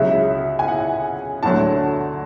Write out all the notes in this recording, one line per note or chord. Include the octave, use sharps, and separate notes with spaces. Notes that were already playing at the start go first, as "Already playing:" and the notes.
Already playing: C#2 C#3 F#3 E5
G#5
F#5
D2 D3 F#3 A3 A5